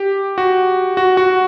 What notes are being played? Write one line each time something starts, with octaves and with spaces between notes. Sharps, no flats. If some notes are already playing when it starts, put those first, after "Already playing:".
Already playing: G4
F#4
F#4
F#4